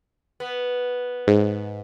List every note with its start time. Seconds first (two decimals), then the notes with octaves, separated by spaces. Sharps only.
0.40 B3
1.27 G#2